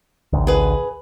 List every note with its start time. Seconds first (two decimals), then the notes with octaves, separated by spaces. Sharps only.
0.33 A1 D2
0.47 G#4 B4